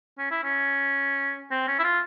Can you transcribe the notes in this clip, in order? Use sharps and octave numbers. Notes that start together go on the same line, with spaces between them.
C#4
E4
C#4
C4
C#4
E4
F4